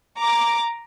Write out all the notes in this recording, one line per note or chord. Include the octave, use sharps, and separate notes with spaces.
A#5 D6